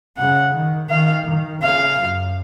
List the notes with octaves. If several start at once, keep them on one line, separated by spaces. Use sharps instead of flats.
C#3 F#5
D#3
D#3 F5
D#3
C#3 F5
F#2